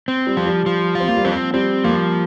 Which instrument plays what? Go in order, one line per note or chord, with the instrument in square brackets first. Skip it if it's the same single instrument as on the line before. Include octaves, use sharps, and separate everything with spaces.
[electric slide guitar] C4
[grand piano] G3
[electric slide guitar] F3
[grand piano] G3
[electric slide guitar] F3
F4
[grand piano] C4
A#3
G3
[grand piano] F3 [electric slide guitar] C4
[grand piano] G3 [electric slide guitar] C4
[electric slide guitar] F3 [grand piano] A#3